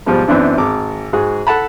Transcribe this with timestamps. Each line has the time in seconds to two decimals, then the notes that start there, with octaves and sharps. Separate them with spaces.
0.06 G#2 B2 F3 G3
0.28 F#2 E3 B3 C4 D4 E4
0.58 G#1 D6
1.13 G#2 F#4 G#4
1.47 A4 F#5 A5 B5